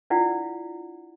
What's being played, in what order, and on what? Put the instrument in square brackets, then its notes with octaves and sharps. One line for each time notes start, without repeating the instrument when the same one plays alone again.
[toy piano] D4 E4 F4 D5 F#5